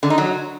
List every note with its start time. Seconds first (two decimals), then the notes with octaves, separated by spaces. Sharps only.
0.03 D3
0.10 D#4
0.18 F#3